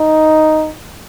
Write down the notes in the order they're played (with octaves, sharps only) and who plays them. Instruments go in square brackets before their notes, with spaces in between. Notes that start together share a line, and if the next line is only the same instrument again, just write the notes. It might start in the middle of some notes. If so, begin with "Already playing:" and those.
Already playing: [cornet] D#4